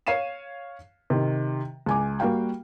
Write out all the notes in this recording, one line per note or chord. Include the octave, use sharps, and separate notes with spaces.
C#5 F5 C7 D#7 E7
C3 D#3
C#2 G#5 D6
G3 A#3 F#4 F5 G5